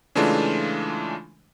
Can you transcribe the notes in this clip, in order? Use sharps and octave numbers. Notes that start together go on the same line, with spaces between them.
C#3 E3 G#3 A3 D4 F4